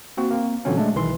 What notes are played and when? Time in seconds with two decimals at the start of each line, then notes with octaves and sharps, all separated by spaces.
0.17 A#3 C4 F#4
0.31 A#3 C4
0.65 A#2 D3 E3 F#3 C4 C#4
0.77 G#3 A3 D4
0.95 B1 D#3 E3 C6